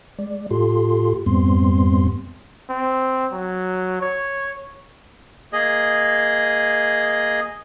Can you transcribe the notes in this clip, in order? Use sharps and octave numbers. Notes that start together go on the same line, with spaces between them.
G#3 D5
A2 F4 G4 A4 C6
F2 G#2 G3 B3 C4 C6
C4
F#3
C#5
A#3 G#4 D#5